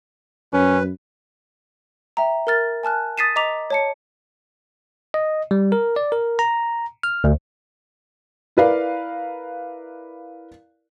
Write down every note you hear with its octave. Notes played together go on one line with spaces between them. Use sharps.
F#2 C#4 B4
E5 G5 A#5
A#4 A#5 F6 A6
G#5 A5 F6 F#6
D#6 A6 B6 C7 D#7 E7
D#5 A#5 D6 B6 F7
C#5 A5 C#7
D#5
G3
A#4
D5
A#4
A#5
F6
D2
E4 A#4 B4 D5 F5